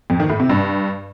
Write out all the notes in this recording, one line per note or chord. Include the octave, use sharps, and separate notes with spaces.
F2
D#3
A2
C3
G2